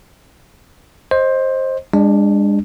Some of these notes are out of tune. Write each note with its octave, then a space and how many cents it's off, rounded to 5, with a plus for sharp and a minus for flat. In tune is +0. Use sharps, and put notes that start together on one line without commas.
C5 +15 D#5 +0
G#3 -35 D4 +0